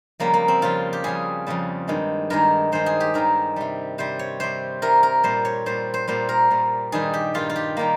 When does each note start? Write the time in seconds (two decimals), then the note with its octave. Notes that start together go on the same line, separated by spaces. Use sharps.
0.20 F2 C#3 G3 A#3
0.34 A#3
0.48 C4
0.62 F2 C#3 G3 F4
0.93 G4
1.04 F2 C#3 G3 G#4
1.47 F2 C#3 G3
1.88 G2 D#3 G#3
2.30 G2 D#3 G#3 A#4
2.72 G2 D#3 G#3 C5
2.86 G#4
3.00 G4
3.14 G2 D#3 G#3 A#4
3.56 C3 G3
3.98 C3 G3 C5
4.19 C#5
4.40 C3 G3 C5
4.82 C3 G3 A#4
5.03 A#4
5.24 A#2 G3 C5
5.45 C#5
5.66 A#2 G3 C5
5.94 C5
6.07 A#2 G3 C5
6.29 A#4
6.51 A#2 G3
6.92 G2 D#3 G3 G#4
7.14 G4
7.34 G2 D#3 G3 F4
7.49 F4
7.56 G4
7.77 D#3 G3 A#3